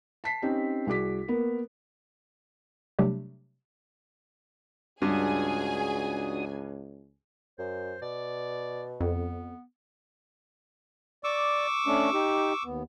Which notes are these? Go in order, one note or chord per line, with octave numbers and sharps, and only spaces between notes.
A5 B6 C7
C4 C#4 D#4 G4
C2 F#4 G#4 D6 B6
A#3 B3 A#4
C3 F#3 G3 A3 D4 G4
C#2 G2 D4 F#4 G#4 G#5 D#6
F#2 C5
B2 D5
F2 B3
D5 C#6 D6 E6
A3 C#4 D4
D#4 G4
D#2 B3